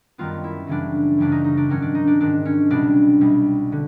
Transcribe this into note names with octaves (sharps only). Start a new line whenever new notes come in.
F#2 D#3 G3 B3 F4
E4
F#2 C#3 E3 G3 D4
F#2 C#3 E3 G3 D4
D#4
D#4
D4
G#2 D#3 F#3 C#4
D4
D#4
D4
G#2 D#3 F#3 D4
C#4
C2 B2 G3 D4
C2 B2 G3
D3